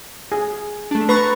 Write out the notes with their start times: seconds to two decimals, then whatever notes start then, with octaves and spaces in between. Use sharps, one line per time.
0.32 G#4
0.91 A3 D4
1.09 B4 A#5 C#6 A6